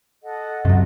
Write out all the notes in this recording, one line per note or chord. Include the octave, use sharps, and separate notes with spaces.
A4 D#5 F#5
F#2 C3 F#3